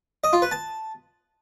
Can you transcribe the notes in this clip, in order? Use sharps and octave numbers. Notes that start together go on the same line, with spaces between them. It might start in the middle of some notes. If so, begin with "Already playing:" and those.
D#5
F4
B4
A5